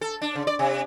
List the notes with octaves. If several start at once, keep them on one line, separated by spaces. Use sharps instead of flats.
A4
D4
C#3
D5
C3